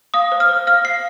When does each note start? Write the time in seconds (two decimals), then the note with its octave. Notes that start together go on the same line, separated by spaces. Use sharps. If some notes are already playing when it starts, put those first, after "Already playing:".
0.14 F5 D#6
0.32 C5
0.40 F6
0.49 C5
0.67 F5 F6
0.85 F5 C7